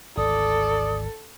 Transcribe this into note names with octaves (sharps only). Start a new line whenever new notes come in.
G#1 D2 A4 D5 D#6